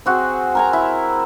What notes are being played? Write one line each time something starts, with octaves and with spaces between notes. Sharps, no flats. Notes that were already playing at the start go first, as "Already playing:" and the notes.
C4 F#4 G#4
A#4 G#5 A#5
E4